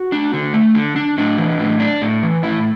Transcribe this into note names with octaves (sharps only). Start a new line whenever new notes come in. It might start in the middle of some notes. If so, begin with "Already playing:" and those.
Already playing: F#4
D4
D3
A3
D3
D4
A2 D4
E3
A2
D4
A2
E3
A2 E4